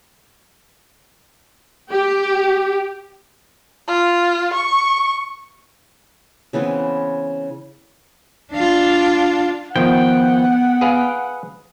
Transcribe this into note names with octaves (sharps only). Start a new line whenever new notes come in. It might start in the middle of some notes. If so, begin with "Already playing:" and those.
G4
F4
C#6
C#3 E3 B3 C4
D4 F4
D#3 F3 B3 E4 F#5 G5
G#4 B4 F5